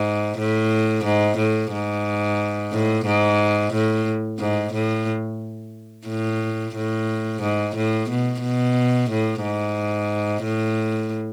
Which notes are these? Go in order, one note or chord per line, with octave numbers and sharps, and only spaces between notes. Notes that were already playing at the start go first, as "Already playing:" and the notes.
Already playing: G#2
A2
G#2
A2
G#2
A2
G#2
A2
G#2
A2
A2
A2
G#2
A2
B2
B2
A2
G#2
A2